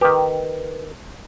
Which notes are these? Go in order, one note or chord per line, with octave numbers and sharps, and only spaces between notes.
D#3 G4 B4